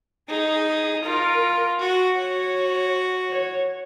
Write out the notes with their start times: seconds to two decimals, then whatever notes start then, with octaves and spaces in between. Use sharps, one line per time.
0.28 D#4 G#4
0.66 G#4
1.04 F4 A#4
1.80 F#4
2.17 F#4 C#5
3.31 C#5